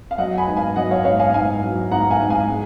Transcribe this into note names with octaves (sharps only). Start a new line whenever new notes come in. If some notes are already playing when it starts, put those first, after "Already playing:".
F5
F#3 D#5 F#5
G#5 B5
G#2
F5 G#5
F#3 D#5 F#5
C#5 F5
G#2 C#5 F5
F5 G#5
G#2 F5 G#5
F#3
G#2 F#5 A#5
F5 G#5
G#2
F5 G#5
G#3